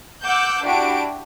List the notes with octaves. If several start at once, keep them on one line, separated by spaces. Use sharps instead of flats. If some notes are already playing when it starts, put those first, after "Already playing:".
F#5 D6 E6 G6
D4 E4 F#4 G4 D7